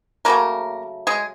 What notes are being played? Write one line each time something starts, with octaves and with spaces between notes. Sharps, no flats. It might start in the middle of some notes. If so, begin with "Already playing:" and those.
C#3 F#3 A3 A#3 A#4
G#3 G#4